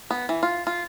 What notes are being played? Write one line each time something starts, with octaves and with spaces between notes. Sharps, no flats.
B3
E3
F4
F4